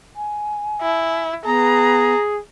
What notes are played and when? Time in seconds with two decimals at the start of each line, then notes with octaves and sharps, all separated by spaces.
0.16 G#5
0.81 E4
1.45 B3 G#4 A#5